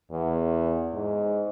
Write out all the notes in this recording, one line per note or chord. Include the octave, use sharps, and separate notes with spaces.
E2
G#2